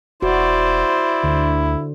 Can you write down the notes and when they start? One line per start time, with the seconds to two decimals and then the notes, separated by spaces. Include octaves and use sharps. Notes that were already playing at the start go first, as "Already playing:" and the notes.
0.22 E1 E4 F#4 C5 D5
1.23 D2 D3